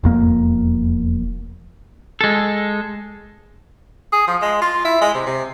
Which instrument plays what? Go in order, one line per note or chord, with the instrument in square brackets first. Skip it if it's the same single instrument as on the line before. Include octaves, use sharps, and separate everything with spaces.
[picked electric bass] E1 F2 A#3
[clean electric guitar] G#3 A4
[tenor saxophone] G#4
F3
G#3
F4
E4
G#3
C3
C3